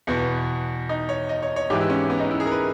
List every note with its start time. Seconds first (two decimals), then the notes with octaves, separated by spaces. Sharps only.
0.07 E2 B2 B3
0.89 D#4
1.09 C#5
1.29 D#5
1.43 C#5
1.56 C#5
1.70 G#2 E3 G4
1.80 E4
1.90 C#4
2.10 B3
2.20 D#4
2.31 E4
2.40 G#4
2.46 A#4
2.51 B4